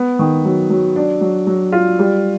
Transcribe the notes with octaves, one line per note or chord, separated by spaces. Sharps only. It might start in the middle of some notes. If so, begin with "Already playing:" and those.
Already playing: B3
D#3
F#3
F#3
D4
F#3
F#3
F4
G3